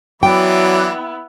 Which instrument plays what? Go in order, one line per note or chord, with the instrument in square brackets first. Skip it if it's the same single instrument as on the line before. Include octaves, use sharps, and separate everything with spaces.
[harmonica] E3 D4 D6 [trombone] F#3 [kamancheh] B3 E4 [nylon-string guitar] G5